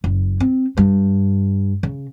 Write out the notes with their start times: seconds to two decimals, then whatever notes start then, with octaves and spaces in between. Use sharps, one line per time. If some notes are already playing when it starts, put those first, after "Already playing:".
0.04 F#1
0.40 C4
0.77 G2
1.83 C#3